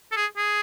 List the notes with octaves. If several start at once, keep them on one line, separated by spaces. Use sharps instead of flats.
A4
G#4
G#4